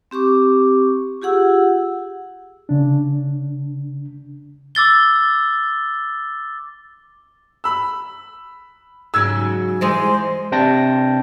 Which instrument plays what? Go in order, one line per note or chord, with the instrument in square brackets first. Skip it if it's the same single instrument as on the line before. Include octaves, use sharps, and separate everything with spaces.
[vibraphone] C4 G4 C#6 D6
F4 G4 G#4 F#5 E6
[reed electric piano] C#3 D4
[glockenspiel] D6 E6 A6 G7
[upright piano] B5 E6
[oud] G#2 C#3 F#3 [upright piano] E6 G#6
[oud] E3 G#3 D#5 [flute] C5
[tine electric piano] C3 D4 G5 A5 A#6